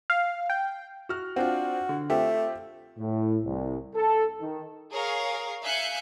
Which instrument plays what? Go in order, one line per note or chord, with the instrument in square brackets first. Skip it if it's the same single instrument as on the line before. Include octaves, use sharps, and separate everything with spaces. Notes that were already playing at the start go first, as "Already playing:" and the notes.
[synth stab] F5
G5
[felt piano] F#4 F6
[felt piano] C4 D4 F4 [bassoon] F#4
[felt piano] D3
[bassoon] A3 [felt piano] C4 F4 G4
[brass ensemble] A2
C2
A4
D#3
[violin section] G#4 A#4 C#5 F5
E5 F5 G#5 F#6 G6 C#7